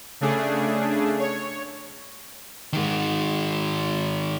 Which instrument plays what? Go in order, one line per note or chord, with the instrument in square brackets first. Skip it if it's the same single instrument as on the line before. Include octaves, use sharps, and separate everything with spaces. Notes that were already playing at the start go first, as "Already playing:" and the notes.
[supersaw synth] C#3 A3 D4 G#4
C#5
[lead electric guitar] D#3 G#3